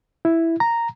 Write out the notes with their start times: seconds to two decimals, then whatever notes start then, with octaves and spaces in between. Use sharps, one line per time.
0.25 E4
0.60 A#5